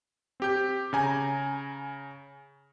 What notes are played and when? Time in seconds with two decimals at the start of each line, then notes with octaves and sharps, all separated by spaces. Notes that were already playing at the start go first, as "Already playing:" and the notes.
0.40 C4 G4 G6
0.93 C#3 G#5 A#5